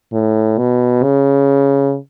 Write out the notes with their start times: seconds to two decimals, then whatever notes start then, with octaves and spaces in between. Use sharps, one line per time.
0.13 A2
0.58 B2
1.04 C#3